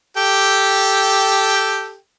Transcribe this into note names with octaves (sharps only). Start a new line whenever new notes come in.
G4 A4 G5